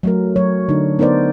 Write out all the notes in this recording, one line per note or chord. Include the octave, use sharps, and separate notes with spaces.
F#3 A3 A#4
F#3 C#5
D3 D4 D#4
B3 D#4 A#4 C5 D5